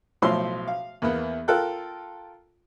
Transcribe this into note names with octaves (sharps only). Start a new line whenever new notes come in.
B1 A2 F3 C6 E6
F5
E2 A#3 B3
F4 A4 A#4 G5 F#6